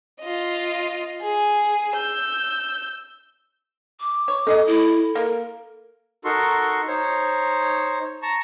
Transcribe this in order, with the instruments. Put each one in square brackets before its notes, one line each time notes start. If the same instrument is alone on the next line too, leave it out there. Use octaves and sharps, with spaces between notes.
[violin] F4 D#5
G#4
E6 G6
[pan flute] D6
[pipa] C#5
[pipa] D#4 G#4 D#5 [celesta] A4
[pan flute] E4
[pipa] A#3 [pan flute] A#4
[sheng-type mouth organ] D#4 F#4 A4 A#4 C6 C#6
D#4 C5 C#5
A5 A#5 C#6